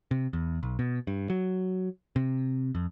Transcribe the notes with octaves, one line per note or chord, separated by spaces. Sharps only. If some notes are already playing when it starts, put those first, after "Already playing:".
C3
E2
B1
B2
G2
F#3
C3
F2